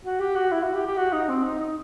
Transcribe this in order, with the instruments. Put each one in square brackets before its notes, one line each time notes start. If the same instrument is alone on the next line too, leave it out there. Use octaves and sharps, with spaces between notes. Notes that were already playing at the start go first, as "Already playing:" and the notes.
[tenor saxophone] F#4
G4
F#4
E4
F#4
G4
G4
F#4
D#4
C4
D#4
D#4